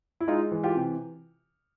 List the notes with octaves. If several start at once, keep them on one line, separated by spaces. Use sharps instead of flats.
E4
G#3 D#4 F4
E3
F4 G4
C3